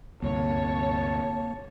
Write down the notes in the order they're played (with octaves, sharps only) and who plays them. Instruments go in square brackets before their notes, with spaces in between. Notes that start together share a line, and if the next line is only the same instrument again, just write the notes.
[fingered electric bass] D2 G2 C3 [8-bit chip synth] A#3 [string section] C#5 [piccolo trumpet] A5